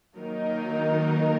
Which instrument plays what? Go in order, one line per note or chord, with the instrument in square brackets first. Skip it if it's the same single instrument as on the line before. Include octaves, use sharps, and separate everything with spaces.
[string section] D#3 F#3 A#3 D#4 A#4